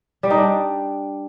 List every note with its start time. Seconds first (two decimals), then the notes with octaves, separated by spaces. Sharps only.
0.23 G3
0.30 D#4
0.38 D4